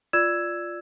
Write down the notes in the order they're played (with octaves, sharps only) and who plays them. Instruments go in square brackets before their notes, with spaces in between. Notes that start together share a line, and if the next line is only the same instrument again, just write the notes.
[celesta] F4 D5 E6 G#6 E7